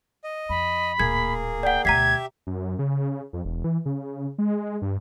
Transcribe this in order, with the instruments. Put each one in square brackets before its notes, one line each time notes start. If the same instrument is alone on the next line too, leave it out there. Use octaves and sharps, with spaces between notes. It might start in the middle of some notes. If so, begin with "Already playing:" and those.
[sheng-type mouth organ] D#5
[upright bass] F2 [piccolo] B5
[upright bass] D1 A#2 [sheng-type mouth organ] A#3 G#4 [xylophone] G#6
[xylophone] D5 F#5 [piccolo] G5
[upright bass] D2 B2 [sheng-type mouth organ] G4 E5 [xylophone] A#5 B6 C7 [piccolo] G#6
[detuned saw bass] F#2
C#3
F2
E1
E3
C#3
G#3
G2